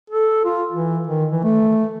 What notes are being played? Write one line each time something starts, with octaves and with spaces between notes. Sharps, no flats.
A4
F4
E3
D#3
E3
A3